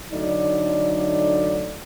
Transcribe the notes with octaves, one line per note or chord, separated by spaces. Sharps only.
D3 F#3 A3 D#4 D5